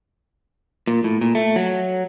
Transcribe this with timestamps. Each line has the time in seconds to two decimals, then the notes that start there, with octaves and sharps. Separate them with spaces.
0.87 A#2
1.04 A2
1.21 A#2
1.35 A3
1.56 F#3